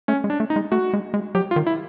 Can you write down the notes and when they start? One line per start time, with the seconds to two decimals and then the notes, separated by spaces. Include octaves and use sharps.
0.08 A3 C#4
0.24 G#3
0.30 D4
0.40 A3
0.50 D#4
0.56 G#3
0.72 A3 F#4
0.93 G#3
1.14 G#3
1.35 F#3 G4
1.51 F4
1.56 D#3
1.67 E4